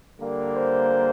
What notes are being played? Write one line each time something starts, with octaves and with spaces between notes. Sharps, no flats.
D3 G3 A#3
C5